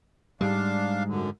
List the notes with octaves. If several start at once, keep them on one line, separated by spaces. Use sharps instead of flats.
G#2 G3 G#3 D4 F5
F#2 D3